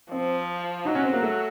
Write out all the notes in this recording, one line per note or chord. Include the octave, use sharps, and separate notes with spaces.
F3 C4
F#3 D#4
C#4
C4
A#3
A3